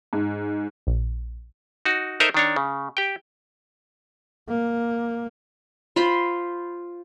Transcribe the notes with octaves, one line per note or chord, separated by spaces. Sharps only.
G#2
A#1
D#4 F#4
D#4 A4 A#4 C5 D#5 E5
D#3 D4 C#5
C#3
G4 G5
A#3
F4 C5 B5 C6